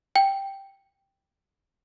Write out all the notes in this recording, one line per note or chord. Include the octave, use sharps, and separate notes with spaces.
G5